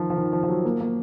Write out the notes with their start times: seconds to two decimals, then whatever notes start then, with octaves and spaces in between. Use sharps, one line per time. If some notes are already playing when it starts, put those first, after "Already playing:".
Already playing: D#3 F3
0.10 F3
0.17 D#3
0.33 F3
0.43 F3
0.49 F#3
0.65 A#3
0.80 A#3